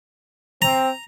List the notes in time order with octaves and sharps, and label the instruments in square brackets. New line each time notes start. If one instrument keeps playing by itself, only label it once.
[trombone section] C4 [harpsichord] A#5